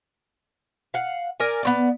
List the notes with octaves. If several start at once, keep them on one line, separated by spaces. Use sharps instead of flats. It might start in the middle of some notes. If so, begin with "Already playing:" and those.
F5 F#5
A#4 D5 G#5
B3 C4 D5